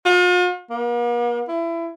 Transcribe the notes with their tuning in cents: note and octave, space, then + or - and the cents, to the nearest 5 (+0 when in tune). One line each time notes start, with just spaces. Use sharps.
F4 +45
A#3 +45
E4 +25